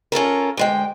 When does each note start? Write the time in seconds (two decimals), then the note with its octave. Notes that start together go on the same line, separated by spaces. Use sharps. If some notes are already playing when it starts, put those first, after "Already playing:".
0.12 C#4 F4 A4 A#4
0.57 D2 G#3 G5